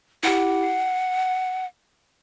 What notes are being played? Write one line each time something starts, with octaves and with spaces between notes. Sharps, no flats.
E4 G4 F#5
C7